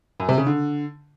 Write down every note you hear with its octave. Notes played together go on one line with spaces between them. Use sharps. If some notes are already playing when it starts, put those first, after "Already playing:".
F#2
C3
C#3
D3